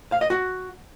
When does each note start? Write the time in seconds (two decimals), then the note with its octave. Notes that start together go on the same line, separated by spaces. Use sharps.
0.12 F5
0.21 D#5
0.30 F#4